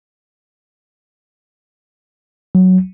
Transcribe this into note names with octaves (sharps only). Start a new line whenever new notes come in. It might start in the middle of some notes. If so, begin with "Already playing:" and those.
F#3